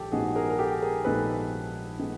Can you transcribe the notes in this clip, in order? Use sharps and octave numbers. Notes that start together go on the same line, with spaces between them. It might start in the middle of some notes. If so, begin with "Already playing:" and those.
Already playing: A#1 G#2 D#3 G4 A4
A#1 G#2 D#3 G#3 B3 F#4 G#4
G#4 A#4
A#4
G4 A4
G#4 A#4
A#1 G#2 D#3 G#3 B3 A4 B4
D#3 G#3 B3